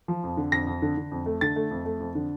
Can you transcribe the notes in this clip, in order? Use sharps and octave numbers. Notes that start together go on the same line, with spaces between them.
F3
F2
D3
F2 A#6
F2
D3
D3
F2
A3
D3 A6
A3
F2
A3
F2
D3